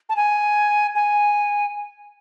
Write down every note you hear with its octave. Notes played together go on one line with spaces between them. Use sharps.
A5
G#5
G#5